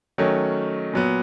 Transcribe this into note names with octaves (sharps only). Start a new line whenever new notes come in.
D#3 F#3 A3 C#4
A#2 F#3 B3